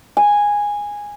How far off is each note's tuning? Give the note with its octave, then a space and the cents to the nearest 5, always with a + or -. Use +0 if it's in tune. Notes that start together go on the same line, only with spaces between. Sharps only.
G#5 -10